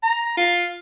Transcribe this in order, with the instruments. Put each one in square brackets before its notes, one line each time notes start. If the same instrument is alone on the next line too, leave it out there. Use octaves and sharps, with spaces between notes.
[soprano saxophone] A#5
F4